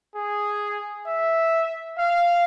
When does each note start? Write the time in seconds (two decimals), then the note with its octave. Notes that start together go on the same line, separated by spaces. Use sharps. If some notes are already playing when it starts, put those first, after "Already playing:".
0.15 G#4
1.06 E5
1.99 F5